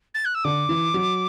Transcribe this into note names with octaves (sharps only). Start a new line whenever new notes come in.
A6
F#6
E6
D3 D6
E3
F#3